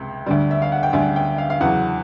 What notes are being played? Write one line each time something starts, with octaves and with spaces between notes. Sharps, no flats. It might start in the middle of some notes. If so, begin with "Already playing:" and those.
Already playing: C#2 C3
D2 D3 G3
E5
F5
F#5
G5
D2 D3 G3 G#5
G5
F5
F5
E2 C#3 F#3 F#5